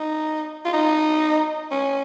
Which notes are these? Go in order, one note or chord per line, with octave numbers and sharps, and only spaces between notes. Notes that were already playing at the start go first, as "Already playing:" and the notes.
Already playing: D#4
F4
D#4
C#4